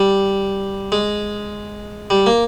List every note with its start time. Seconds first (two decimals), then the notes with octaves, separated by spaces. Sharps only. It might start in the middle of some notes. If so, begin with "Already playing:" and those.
Already playing: G3
0.92 G#3
2.10 G3
2.26 A#3